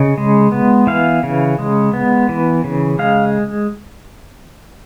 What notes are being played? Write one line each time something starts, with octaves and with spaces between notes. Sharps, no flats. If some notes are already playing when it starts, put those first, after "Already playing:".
Already playing: C#3 D#5
G#3
B3
E3 F5
C#3
G#3
B3
E3
C#3
G#3 F5